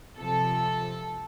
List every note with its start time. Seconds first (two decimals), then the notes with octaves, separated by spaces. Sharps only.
0.18 C3 F3 A4